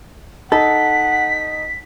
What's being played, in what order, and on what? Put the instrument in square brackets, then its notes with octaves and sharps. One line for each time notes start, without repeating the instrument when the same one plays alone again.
[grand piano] D#4 [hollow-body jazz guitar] A4 [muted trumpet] F#5 [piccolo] B6